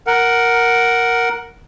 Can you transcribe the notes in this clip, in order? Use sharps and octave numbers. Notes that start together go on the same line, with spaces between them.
A#4 F#5